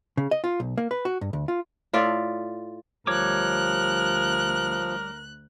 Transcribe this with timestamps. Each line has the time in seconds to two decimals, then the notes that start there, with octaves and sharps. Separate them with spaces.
0.17 C#3
0.31 D#5
0.44 F4
0.60 B1
0.78 A#3
0.91 B4
1.05 F#4
1.21 G2
1.33 D2
1.48 F4
1.93 A2 F4 D5 E5
3.07 D2 F3 G3 A#4 C#5 D6 F#6